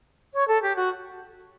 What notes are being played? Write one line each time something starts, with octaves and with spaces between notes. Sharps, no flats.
C#5
A4
G4
F#4